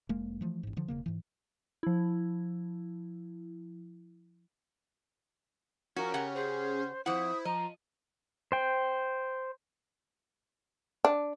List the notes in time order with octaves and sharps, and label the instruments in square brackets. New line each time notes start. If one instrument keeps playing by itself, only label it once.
[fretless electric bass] F1 G#3 A#3
E3 F3 A3
A1 G#2
D3 F3
E1 C#3 A#3
G#2 E3
[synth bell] F3 E4
[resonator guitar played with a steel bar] F3 F#4 [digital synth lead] C#4 [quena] A#4 [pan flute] C#6
[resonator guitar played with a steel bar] C#3 G4 F#5
[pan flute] G#4 [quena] C5
[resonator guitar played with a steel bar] F2 F#5 [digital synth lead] E4 [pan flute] C5 [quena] D#6
[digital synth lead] F3 [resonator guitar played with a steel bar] D#5 [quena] A#5
[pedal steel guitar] C5 G5
[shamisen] D4